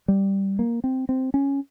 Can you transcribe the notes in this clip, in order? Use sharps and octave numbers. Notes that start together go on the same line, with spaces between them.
G3
A#3
C4
C4
C#4